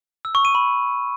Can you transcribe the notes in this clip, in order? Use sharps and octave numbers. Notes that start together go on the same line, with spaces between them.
E6
C#6
D#7
B5